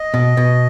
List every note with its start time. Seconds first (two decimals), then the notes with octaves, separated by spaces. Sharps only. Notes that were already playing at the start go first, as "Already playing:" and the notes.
Already playing: D#5
0.14 B2
0.37 B2